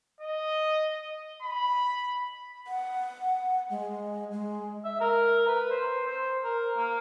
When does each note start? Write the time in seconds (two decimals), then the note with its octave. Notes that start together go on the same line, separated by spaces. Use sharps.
0.21 D#5
1.42 B5
2.67 F#5
3.70 G#3
4.32 G#3
4.84 E5
5.01 A#4
5.47 B4
5.70 C5
6.06 C5
6.44 A#4
6.77 A#3